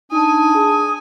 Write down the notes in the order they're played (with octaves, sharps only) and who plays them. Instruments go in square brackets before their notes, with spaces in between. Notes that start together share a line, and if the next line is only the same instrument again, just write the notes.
[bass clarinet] D4 [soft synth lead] D#4 [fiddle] G#5 [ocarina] D#6
[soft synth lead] G#4